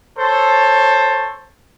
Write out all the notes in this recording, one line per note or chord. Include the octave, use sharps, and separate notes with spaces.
A4 C5 C#5